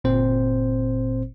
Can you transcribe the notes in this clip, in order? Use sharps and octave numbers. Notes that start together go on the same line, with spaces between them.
G1 A#2 C4 C5